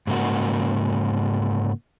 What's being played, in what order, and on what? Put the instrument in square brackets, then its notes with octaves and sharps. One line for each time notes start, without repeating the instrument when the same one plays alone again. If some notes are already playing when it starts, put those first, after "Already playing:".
[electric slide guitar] G#2 C#3 A#3 F#4